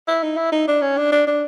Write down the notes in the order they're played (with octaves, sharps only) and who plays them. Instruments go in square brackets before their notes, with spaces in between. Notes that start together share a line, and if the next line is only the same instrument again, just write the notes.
[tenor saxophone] E4
D#4
E4
D#4
D4
C#4
D4
D4
D4